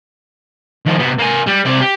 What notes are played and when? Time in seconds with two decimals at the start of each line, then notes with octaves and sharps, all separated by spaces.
0.86 D#3 F3
0.99 C3 B3
1.19 A#3 G#5
1.47 G3
1.66 C3 D5
1.81 G4